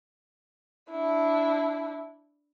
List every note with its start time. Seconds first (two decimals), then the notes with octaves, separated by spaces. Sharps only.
0.90 D4 E4